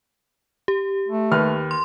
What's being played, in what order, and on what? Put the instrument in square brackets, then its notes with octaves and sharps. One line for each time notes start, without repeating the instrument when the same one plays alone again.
[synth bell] G4
[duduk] A3
[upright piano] D#2 B4 F6
[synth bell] C6